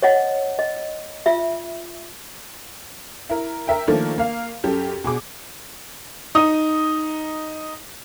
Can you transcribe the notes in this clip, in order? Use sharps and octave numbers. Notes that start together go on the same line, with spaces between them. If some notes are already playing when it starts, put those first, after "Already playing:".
C#5 D#5 F#5
D#5
F4 E5
E4 A#4
A#4 E5 G5
D#3 F3 A3 A#3 D4
A#3 F5
F#2 G4 A4
B2 G#4 D6
D#4 D#6